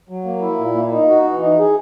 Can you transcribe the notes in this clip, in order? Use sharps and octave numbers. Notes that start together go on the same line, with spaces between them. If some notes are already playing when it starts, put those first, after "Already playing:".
F#3
A#3
E4
A#2
A#3
D#4
F#4
E3
D#4
G#4